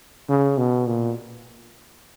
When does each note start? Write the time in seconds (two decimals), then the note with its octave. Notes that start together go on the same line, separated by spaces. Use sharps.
0.29 C#3
0.58 B2
0.87 A#2